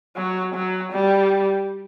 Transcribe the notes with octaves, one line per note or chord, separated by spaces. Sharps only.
F#3
F#3
G3